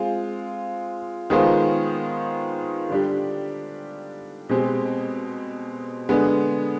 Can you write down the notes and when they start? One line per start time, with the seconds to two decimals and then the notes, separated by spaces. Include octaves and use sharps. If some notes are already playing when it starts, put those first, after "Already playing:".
Already playing: G#3 C4 F4 C5
1.30 D#3 G#3 B3 F4 C5
2.90 D3 G3 D4 G4
4.49 B2 G#3 C4 G4
6.09 D3 G#3 B3